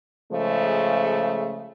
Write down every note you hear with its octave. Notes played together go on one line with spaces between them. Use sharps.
C#3 F3 G#3 A3